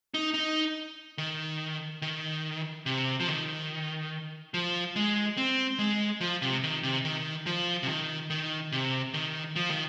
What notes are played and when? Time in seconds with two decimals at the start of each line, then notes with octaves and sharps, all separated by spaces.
0.14 D#4
0.34 D#4
1.18 D#3
2.02 D#3
2.86 C3
3.20 F3
3.28 D#3
4.54 F3
4.96 G#3
5.37 C4
5.79 G#3
6.21 F3
6.42 C3
6.63 D#3
6.83 C3
7.05 D#3
7.46 F3
7.83 C3
7.88 D#3
8.30 D#3
8.72 C3
9.13 D#3
9.56 F3
9.70 D#3